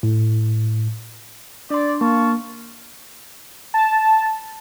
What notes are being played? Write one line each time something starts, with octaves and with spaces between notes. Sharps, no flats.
A2
D4 D5 C6
A#3 F5 A5 C#6
A5